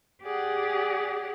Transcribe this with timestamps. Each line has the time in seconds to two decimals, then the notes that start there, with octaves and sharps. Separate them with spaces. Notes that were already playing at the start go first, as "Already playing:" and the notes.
0.23 G4 G#4 D5 F#5